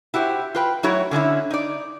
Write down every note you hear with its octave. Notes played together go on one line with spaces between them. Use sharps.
E4 F#4 G4 C5
F4 B4 G5
F#3 A3 E4 F#4 C#5
D3 C#4 D#4 E4
D#4 D5